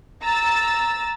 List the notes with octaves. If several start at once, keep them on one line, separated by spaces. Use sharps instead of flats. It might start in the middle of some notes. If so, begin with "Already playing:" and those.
A#5 E6 A6